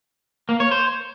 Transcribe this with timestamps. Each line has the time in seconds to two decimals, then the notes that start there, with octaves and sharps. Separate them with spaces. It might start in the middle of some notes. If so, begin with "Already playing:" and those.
0.49 A#3
0.60 C#5
0.71 C5